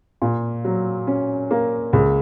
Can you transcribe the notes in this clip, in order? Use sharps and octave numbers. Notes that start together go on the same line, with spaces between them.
A#2
F#3
C#4
A#3
C#2